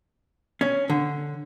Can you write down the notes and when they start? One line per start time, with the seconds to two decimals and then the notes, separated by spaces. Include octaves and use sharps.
0.61 C#4
0.90 D3